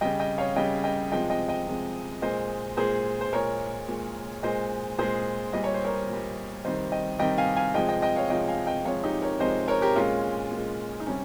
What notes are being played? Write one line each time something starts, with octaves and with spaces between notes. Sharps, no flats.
C#3 G3 D#5 G5
D#5 G5
C#5 F5
C#3 G3 D#5 G5
D#5 G5
C3 F3 G#3 D#5 G5
D#5 G5
D#5 G5
C3 F3 G#3
A#2 G#3 C5 D#5
A#2 G#3 G#4 C5
C5
A#2 G#3 A#4 C#5
A#2 G#3
A#2 G#3 C5 D#5
A#2 G#3 G#4 C5
A#2 G3 D#5
C#5
C5
A#4 C#5
A#2 G3
C3 D#3 G3 C5 D#5
D#5 G5
C3 D#3 G3 D#5 G5
F5 G#5
F5 G#5
C3 F3 G#3 D#5 G5
D#5 G5
D#5 G5
C#5 F5
C3 F3 G#3 D#5 G5
F5 G#5
D#5 G5
C3 F3 G#3 C#5 F5
D#4 G4
A#4 C#5
C3 F3 G#3 C5 D#5
A#4 C#5
G4 A#4
A#2 G#3 C#4 F4
A#2 G#3
D#4
C3 G3 C#4